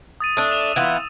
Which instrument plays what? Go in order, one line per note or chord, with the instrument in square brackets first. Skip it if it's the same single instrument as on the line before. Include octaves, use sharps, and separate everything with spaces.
[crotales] D#6 A6 D#7
[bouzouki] A3 D4 [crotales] D#6 E6
[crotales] E7 F7
[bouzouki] E3 B3 F4